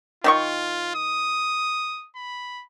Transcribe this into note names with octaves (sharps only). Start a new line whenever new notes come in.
D#3 F4 G4 C#6
D#6
B5